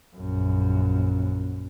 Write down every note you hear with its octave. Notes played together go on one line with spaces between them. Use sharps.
A#1 F#2